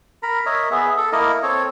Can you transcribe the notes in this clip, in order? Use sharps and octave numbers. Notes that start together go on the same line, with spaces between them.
A#4 A#5 B5
A#4 C#5 D#5 E5
B3 G#4 E5
A4
A#3 E4 A#4 D#5
C4 A4 C#5